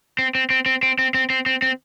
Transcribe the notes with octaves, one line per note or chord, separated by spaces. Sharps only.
C4
C4
C4
C4
C4
C4
C4
C4
C4
C4